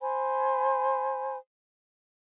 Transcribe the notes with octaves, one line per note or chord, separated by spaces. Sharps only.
C5 G#5 B5